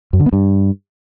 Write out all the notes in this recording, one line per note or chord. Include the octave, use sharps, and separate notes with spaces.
F#2
D3
B3
G2